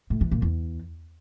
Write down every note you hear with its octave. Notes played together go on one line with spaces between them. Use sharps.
A2
E3
A#2
E2